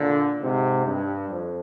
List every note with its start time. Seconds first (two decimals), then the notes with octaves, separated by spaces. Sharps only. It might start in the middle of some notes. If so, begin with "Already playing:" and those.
Already playing: A#2 D3
0.41 G#2 C3
0.86 G2
1.30 F2